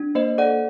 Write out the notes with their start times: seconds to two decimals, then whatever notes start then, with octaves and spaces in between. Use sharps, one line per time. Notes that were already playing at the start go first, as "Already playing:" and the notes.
Already playing: D4
0.15 A#3 C5 D#5
0.38 A4 D5 F#5